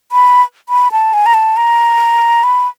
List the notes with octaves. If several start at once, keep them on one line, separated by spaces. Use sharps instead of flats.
B5
B5
A5
G#5
A#5
A5
A#5
B5